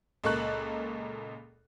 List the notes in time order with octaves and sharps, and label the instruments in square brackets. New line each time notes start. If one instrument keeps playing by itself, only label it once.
[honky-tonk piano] C#2 A#2 A4 A#4 C#6 F#6